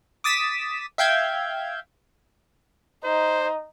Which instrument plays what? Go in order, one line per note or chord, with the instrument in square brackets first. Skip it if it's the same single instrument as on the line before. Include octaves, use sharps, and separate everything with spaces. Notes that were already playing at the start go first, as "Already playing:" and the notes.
[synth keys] D6 D#6 A6 B6 E7
E5 F5 G5 G6 G#6
[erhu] D#4 [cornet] C5